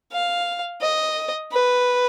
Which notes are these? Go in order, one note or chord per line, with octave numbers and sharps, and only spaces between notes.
F5
D#5
B4